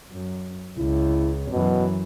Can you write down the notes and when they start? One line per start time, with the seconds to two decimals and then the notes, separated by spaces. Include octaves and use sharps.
0.10 F#2
0.78 C#2 E4
1.52 F#2 B2 E3